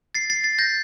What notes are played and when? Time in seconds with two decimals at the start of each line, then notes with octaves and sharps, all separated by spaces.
0.15 A6 C7
0.30 A6 C7
0.44 A6 C7
0.59 G6 A#6